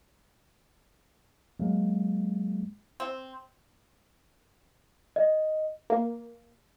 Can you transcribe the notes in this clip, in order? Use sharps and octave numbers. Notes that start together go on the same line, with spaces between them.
F#3 G#3 A#3
C4
D#5
A#3